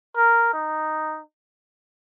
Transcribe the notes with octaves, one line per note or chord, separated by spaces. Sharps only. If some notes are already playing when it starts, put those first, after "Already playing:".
A#4
D#4